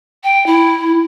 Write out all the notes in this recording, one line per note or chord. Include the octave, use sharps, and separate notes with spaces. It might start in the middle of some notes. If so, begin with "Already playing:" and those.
G5
E4